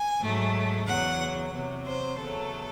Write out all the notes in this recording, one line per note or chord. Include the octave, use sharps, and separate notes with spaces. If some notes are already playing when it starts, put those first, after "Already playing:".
Already playing: G#5
G#2 F#3 A3
E2 C#3 F#3 F#5
E2 C3 F#3
C5
E2 C#3 F#3 A3 A4